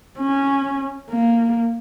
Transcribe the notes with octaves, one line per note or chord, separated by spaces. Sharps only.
C#4
A#3